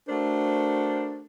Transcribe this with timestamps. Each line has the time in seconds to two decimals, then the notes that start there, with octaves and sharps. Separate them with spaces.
0.08 A3 D4 F#4 A#4 C5